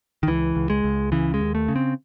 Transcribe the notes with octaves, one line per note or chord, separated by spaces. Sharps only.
D#3
C#2 E3
C#2
G#3
C#2
C#3 E3
G#3
D#2
A3
C#3
C4